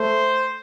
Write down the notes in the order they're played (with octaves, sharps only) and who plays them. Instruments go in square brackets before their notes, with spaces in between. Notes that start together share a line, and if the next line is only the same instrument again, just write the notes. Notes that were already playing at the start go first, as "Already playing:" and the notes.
Already playing: [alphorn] A3 [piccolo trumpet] C5